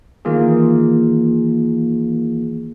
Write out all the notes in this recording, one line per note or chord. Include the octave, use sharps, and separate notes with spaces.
D#3 E3 A#3 F4 G#4